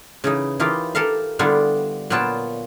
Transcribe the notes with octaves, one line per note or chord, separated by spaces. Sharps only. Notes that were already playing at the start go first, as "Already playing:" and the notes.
C#3 E3 D#4
E3 D#4 F4 G4 A#4
G4 A4 A#4 F5
D3 G3 B3 D4 E4 F4
A#2 F#3 B3 F4 G5 A5